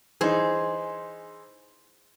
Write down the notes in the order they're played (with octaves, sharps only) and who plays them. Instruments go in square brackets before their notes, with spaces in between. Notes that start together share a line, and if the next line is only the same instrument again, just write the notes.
[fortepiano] E3 D#4 [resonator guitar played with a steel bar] G#4 C5